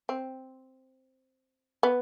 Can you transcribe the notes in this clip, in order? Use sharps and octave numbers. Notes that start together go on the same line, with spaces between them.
C4
B3